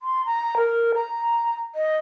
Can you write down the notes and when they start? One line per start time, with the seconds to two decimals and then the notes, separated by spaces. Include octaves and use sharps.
0.02 C6
0.25 A#5
0.57 A#4
0.95 A#5
1.75 D#5